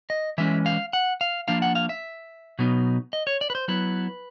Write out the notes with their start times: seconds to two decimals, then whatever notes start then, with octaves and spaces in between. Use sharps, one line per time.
0.10 D#5
0.38 E3 G#3 C#4 E5
0.66 F5
0.93 F#5
1.21 F5
1.48 F3 A#3 D4 F5
1.62 F#5
1.75 F5
1.89 E5
2.59 B2 F#3 B3 D#4
3.13 D#5
3.27 C#5
3.41 D5
3.50 B4
3.55 C5
3.68 F#3 B3 E4 B4